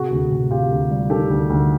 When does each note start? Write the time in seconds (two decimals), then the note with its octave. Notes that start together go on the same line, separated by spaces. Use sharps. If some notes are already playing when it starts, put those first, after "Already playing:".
Already playing: C3 F#4 G#4
0.11 D2
0.31 C3
0.51 C3 F4 G4
0.71 D2
0.91 G3
1.10 D#3 G4 A4
1.30 D2
1.50 D2